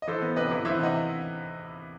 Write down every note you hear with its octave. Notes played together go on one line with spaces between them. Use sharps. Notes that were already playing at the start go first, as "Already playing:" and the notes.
D#5
E3 A4 C5
B3
C3 B4 D#5
E3
E3 C5 E5
C3 D#5 F#5